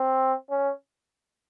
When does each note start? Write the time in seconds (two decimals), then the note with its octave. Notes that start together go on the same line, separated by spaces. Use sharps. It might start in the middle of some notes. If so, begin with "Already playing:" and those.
Already playing: C4
0.50 C#4